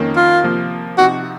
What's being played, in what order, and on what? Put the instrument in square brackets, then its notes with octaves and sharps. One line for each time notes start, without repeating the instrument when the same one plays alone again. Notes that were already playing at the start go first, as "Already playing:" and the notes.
Already playing: [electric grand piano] F2 D#3 A#3 C#4
[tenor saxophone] F4
[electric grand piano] C3 F3 A#3
[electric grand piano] C3 F3 C4 D#4 [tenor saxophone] F#4